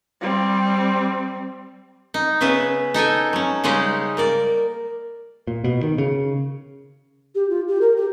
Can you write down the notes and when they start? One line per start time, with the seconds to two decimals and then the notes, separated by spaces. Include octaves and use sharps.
0.21 G3 C4
2.14 D#4
2.41 C#3 B3 C#4 B4 E5
2.94 D#4 A4 G5 G#5
3.33 F#3 C#4
3.64 C#3 G3 G#3 C#4 D#4 G4
4.17 A#3 A#4 D5
5.47 A#2
5.64 B2
5.83 D#3
5.98 C#3
7.35 G4
7.50 F4
7.68 G4
7.81 A#4
7.97 G4